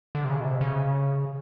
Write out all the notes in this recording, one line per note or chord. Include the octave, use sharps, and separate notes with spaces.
D3
C3
C#3
B2
C3
C#3